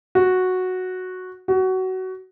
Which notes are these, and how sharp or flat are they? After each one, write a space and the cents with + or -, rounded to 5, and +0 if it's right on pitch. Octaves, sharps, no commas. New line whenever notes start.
F#4 -5
F#4 +20